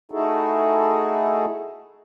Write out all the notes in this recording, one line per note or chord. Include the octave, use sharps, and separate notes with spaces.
A3 D#4 E4 F#4 G#4 A4